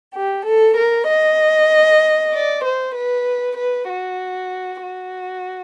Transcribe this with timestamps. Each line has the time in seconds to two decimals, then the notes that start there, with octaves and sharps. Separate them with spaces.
0.14 G4
0.45 A4
0.76 A#4
1.07 D#5
2.32 D5
2.64 C5
2.95 B4
3.57 B4
3.89 F#4
4.83 F#4